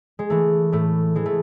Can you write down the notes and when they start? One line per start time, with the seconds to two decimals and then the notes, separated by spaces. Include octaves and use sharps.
0.19 G#3
0.30 E3 A3
0.72 A2 A3
1.15 E3 G#3
1.26 A3